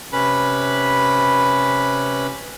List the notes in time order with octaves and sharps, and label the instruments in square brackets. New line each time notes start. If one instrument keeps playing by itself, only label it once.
[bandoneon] C3 C#4 B4 B5